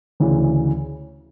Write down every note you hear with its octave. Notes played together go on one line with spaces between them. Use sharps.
D2 C#3 E3